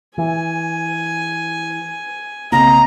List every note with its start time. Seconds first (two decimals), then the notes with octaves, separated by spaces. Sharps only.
0.18 E3 G#5
2.52 B1 C#3 A#3 C4 D#5 A#5